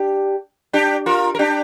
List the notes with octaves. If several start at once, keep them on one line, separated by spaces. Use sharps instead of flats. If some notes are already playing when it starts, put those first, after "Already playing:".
Already playing: D4 G4
D4 G4
F4 A#4
A#4
D4 G4